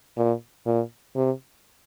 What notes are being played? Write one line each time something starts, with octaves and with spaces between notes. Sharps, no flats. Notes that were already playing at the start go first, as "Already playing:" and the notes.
A#2
A#2
C3